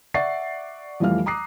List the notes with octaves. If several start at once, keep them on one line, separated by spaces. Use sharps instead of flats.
D5 E5 F#5 C#6 A6 C7
F2 E3 G3 A3 F5 F6
A#5 D6 D#6 F#6 C7